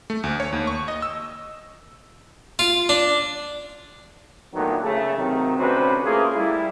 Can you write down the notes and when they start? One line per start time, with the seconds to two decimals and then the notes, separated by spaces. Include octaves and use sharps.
0.10 A3
0.23 D2
0.40 C#5
0.53 D#2
0.67 C#6
0.88 D#5
1.02 E6
2.59 F4
2.89 D4
4.54 A#2 D3 D#3 F#3 A3 B3
4.83 C#3 A3
5.16 C3 D#3 F#3
5.58 D2 C3 C#4 F#4 B4 C5
6.04 A3 A#3 C#4 F4 G#4
6.35 G3 E4